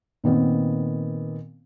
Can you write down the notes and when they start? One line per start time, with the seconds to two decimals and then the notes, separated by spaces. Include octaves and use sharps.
0.24 A#2 D#3 B3 C4